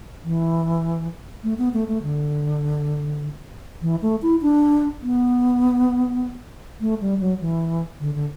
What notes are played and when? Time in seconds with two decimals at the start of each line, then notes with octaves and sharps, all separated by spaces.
0.24 E3
1.43 A3
1.58 B3
1.73 A3
1.88 A3
2.03 D3
3.82 E3
4.02 A3
4.22 E4
4.42 D4
5.02 B3
6.81 A3
7.01 G3
7.20 F#3
7.40 E3
8.00 D3
8.15 D3